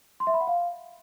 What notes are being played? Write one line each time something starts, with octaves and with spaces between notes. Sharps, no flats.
C6
E5
B5
F#5
F5